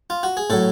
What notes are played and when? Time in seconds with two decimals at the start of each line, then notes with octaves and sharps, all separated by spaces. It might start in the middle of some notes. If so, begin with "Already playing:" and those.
0.10 F4
0.23 F#4
0.37 G#4
0.50 A2 F#3 A4